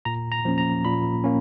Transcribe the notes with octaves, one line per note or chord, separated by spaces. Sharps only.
A#2 A#5
A#5
F3 A#3 C#4
A#5
A#2 B5
A#3 C#4